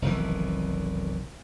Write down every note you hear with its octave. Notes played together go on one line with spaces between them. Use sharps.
F1 B1 D#3 E3